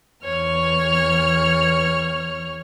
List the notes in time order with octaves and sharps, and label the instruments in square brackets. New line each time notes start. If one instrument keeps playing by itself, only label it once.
[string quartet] E2 C#5 F6